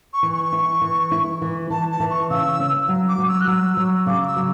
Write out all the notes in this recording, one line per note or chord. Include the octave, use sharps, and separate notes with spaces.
C#6
E3
C#6
E4
E3
E4
E3
E3 A5
A5
E3
C#6
C#3 E6
C#4
F#3
D6
F#3
E6
F#6
F#3 E6
F#3
C#3 D6
D6
E6
F#3